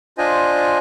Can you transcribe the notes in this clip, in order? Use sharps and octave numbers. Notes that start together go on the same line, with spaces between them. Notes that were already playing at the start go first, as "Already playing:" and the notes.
D4 F4 C5 D#5 G#5